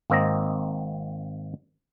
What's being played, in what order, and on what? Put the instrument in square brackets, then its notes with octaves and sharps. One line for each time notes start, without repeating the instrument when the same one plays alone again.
[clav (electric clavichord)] G#1 A#3 C4 D#5 A#5